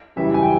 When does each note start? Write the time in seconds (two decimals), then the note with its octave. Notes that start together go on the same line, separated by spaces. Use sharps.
0.16 F#2 C#3 E3 G3 E5
0.34 G#5
0.43 G5